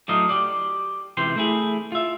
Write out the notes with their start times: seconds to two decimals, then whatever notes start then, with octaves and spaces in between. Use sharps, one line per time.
0.08 A2 D3 F#3 D#4 D#5 F5
0.29 G4 D5
1.17 C#2 C3 E3 G5 C6
1.36 A3 E4 G#4
1.92 F4 E5